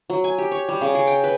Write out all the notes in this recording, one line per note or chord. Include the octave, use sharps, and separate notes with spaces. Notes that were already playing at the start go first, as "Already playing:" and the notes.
F#3
G#5
G4
C#5
G3
C#3
G#4
G5
B4